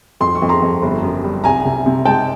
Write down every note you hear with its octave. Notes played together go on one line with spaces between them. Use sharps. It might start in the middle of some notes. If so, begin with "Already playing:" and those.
F2 C6
C#6
F2
A#5 C6
F2
G1
F#2
G3
C2 G#5 A#5
C3
C3
G#3 G5 A5